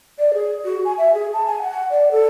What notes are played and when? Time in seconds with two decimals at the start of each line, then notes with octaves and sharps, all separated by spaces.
0.19 D5
0.34 G#4
0.65 F#4
0.85 G#5
0.98 E5
1.14 G#4
1.33 A5
1.46 G#5
1.62 F#5
1.90 D5
2.12 A4